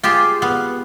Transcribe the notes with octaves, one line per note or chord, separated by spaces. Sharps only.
F4 G4 G#4 C5
B3 F5